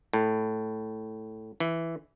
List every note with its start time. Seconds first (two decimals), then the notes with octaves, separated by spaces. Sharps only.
0.13 A2
1.60 E3